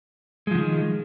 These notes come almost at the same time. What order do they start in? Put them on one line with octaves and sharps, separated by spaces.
G#3 F3 D3 D#3